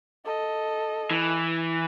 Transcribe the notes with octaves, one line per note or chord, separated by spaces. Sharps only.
A4 D#5
E3